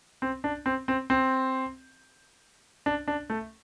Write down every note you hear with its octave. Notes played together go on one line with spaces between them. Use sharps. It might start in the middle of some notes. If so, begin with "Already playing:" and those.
C4
D4
C4
C4
C4
D4
D4
A3